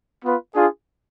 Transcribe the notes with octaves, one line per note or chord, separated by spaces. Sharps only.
B3 F4 B4
D4 F4 G#4